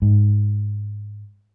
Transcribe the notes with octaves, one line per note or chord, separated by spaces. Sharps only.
G#2